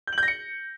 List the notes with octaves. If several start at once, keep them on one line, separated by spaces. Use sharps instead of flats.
G6
F#7
G6
A#6
C#7